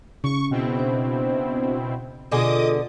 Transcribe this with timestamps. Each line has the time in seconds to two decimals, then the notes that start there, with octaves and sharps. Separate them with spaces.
0.24 C#3 C#6
0.51 B2 C4 E4
0.77 D4 C5
2.31 B2 D3 F4 G#4 A4 D#5 D6 D#6